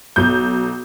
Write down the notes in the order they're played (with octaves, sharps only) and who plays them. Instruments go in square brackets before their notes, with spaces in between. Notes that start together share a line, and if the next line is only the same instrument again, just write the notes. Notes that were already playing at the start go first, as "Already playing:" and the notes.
[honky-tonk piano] B1 G6